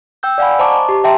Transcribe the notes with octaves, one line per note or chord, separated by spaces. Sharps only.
G5 E6 G6
D5 F5 F#5 G#5 B5
C5 D#5 A5 A#5 C#6 D6
A5
G4
D#5 E5 G5 A5 A#5 C6